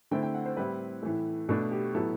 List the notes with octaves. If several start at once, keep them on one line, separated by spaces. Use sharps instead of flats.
D3 A3 C4 E4 G5
G5
F#5
C5
A2 G3 C4 E4 B4
A2 E3 A3
B2 A3 D4 A4
G4
A2 F#3 B3 E4 A4